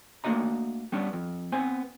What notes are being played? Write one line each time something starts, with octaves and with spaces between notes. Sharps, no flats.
A3 A#3 D4 F#4 D#5 A#5
G3 B3 C#4 D4
F2
B3 C4 C5 G#5